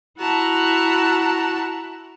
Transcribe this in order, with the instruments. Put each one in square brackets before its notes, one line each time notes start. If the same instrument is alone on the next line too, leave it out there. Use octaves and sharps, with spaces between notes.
[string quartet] E4 F#4 A5 A#5